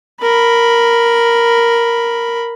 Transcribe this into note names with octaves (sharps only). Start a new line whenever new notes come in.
A#4 B5